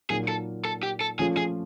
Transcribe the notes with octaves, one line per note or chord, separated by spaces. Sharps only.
A#2 F#3 A#3 D#4 G#4
A4
A4
G4
A4
F3 A3 C#4 F4 G#4
G#4